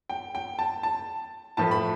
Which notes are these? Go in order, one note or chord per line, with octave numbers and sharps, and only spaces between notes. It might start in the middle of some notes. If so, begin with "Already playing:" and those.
G5
G5
A5
A5
A2 F3 A3 A5
B5